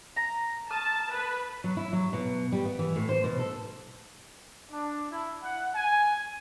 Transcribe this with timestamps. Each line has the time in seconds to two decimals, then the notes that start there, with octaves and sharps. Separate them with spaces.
0.16 A#5
0.70 A5 C#6 D#6 F6
1.13 B4
1.64 F#3
1.77 E4
1.93 F#3
2.13 B2
2.52 G3
2.65 B3
2.79 E3
2.96 A2
3.09 C5
3.24 B2
3.39 A4
4.70 D4
5.11 E4
5.42 F#5
5.74 G#5